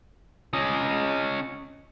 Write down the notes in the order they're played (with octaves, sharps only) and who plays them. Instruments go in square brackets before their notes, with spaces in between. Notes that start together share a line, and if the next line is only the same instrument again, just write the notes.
[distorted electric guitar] C#4 D#5